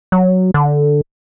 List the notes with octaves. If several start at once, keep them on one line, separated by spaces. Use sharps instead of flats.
F#3
D3